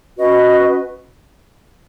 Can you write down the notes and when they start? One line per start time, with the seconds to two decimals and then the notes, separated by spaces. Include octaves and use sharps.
0.17 C#4 F#4 B4 D#5